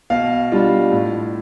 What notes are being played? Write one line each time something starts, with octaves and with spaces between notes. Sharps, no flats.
B2 F5
G3 D4 F4
A2